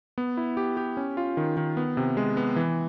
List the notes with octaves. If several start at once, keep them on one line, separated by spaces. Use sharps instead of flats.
B3
E4
G4
G4
C#4
F4
D#3
D#3
B3
C3
G#3
B3
E3